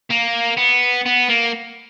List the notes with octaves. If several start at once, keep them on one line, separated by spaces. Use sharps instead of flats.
A#3
B3
B3
A#3